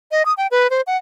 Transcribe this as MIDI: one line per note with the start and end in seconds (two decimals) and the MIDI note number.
0.11 0.25 75
0.26 0.33 87
0.37 0.47 79
0.51 0.70 71
0.70 0.81 72
0.87 0.97 78